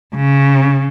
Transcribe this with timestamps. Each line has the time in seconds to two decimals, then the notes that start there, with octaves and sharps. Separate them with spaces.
0.16 C#3